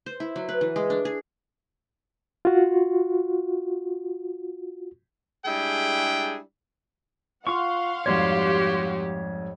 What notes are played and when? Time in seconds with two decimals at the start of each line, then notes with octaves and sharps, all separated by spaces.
0.06 C5
0.20 E4
0.36 F#3
0.49 B4
0.61 E3
0.76 G#3
0.90 D4
1.05 G#4
2.45 F4 F#4
5.46 G3 G#3 D4 E4 G#4 G5
7.47 F4 F5 F#5 C6 C#6
8.06 F2 G#2 G3 F#4 G4 C#5